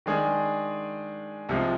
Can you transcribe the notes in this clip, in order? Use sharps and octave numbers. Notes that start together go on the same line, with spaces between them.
D#3 G#3 D4 G#4
C2 C3 F3 G#3